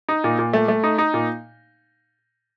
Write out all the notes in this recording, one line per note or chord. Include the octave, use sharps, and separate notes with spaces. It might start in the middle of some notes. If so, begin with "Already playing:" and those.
D#4
A#2
A#2
A3
A3
D#4
D#4
A#2